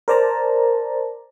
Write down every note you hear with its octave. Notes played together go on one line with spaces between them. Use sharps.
A#4 C5 D5 A5 A#5